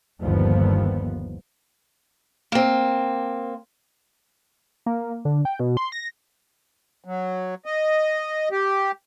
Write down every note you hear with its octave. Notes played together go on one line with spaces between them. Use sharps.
G1 D#2 F3 B3
A#3 C4
A#3
D3
G5
B2
C6
A#6
F#3
D#5
G4